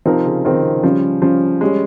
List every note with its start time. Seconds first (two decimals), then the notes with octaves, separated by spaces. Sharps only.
0.06 C3 F3 C4 D#4 A#4
0.26 C#3
0.45 D#3 F3 C4 D#4 A#4
0.83 C#3 F3 G3 C#4
1.22 C#3 F3 G3 C#4
1.61 G3 G#3 C#4 G4 C#5